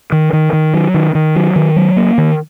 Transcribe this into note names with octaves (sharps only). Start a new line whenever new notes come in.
D#3
D#3
D#3
F#3
D#3
D#3
F#3
D#3
F#3
A#3
D#3